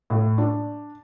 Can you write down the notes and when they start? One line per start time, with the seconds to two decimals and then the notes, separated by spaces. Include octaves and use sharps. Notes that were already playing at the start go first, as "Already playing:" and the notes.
0.10 A2
0.38 D4